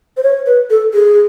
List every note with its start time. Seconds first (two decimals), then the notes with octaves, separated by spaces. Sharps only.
0.17 C5
0.23 C#5
0.46 B4
0.70 A4
0.94 G#4